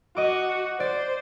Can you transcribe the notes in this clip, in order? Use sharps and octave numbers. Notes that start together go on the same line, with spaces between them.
F#4 D#5 D6
C5 D5